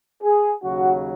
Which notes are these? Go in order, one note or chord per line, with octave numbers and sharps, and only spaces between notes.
G#4
D#2 C#3 F#3 F#4